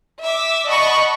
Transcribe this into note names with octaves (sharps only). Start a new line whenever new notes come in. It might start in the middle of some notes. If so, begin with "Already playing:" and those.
E5 D6
D5 D#5 F#5 A5 B5 C#6